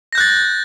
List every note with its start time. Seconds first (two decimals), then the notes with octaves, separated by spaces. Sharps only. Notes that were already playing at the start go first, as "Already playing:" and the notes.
0.13 A#6
0.15 G6
0.18 F#6
0.20 A6